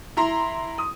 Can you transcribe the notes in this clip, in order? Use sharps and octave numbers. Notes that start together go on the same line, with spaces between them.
E4 A#5 C6
D#6